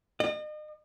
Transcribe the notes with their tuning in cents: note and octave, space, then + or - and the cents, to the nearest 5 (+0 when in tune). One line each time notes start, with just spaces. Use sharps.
D#5 -40